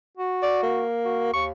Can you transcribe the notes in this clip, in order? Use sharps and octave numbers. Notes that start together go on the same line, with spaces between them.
F#4
D5
A#3
F#4
D#2 C#6